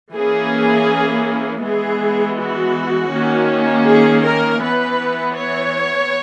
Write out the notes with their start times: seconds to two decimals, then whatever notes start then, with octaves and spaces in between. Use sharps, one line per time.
0.14 E3 A#3 C#4 G#4
1.64 E3 G#3 B3 G#4
2.39 F#4
3.13 D#3 A#3 C#4
3.88 G#4
4.25 A#4
4.63 E3 B3 B4
5.37 C#5